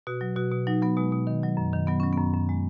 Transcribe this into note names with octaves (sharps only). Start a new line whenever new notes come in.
B2 F#4
F#3
B2 F#4
B2
F#3 D#4
F#3 B3
B2 G#3
B2
D#3
F#3
F#2
D#3
F#3 B3
F#3 C#4
F#2 B3
F#2
G#3